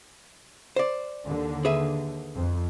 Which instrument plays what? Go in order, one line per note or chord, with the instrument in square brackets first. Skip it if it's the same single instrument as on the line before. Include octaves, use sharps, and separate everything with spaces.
[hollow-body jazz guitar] C5 D5
[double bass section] D#2 D3
[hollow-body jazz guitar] G#4 B4 E5
[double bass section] F2